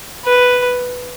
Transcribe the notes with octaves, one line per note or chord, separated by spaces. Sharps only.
B4